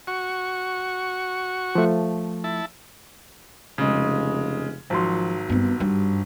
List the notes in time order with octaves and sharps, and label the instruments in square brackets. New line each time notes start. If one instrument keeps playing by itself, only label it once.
[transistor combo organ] F#4 C#6
[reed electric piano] F3 A3
[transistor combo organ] E4 A5
[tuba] F1 [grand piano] C#3 G#3
[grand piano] G#1 F#3 C6 [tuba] F3
[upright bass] G2 C4 [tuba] B3
[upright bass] G2 [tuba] G3